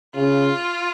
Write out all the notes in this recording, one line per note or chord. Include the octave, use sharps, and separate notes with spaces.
C#3 F4